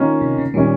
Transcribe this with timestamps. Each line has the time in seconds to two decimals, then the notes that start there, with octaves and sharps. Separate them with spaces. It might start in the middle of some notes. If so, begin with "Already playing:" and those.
Already playing: D#3 A#3 C#4 F4
0.21 C3
0.38 C#3
0.54 A#2 D#3 G3 C#4